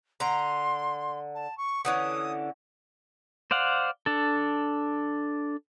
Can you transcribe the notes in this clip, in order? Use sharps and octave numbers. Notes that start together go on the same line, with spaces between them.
D3 A#5 C6
A5
C#6
D3 E3 C#4 D#6
C5 D5 F5 F#5
D4 A4